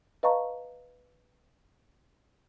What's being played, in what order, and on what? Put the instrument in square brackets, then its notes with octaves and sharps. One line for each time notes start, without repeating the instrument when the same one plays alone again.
[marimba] B4 D#5 F5 A5 A#5 C#6